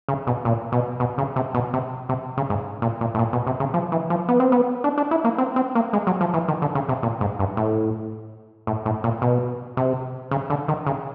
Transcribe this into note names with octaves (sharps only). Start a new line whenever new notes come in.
C#3
B2
A#2
B2
B2
C#3
C3
B2
C3
C3
C#3
G#2
A#2
A#2
A2
A#2
B2
C3
C#3
F3
E3
F3
B3
C4
B3
D4
D4
E4
A#3
C4
C4
A#3
G#3
F#3
F3
E3
D#3
D3
C#3
C3
A#2
G#2
G2
A2
A2
A2
A#2
B2
C3
C#3
D3
D#3
C#3